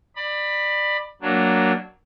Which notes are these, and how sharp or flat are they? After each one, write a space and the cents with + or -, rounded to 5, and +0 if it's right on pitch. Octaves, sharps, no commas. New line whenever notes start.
D5 +25 B5 +0
F#3 +10 A#3 +0 D4 +0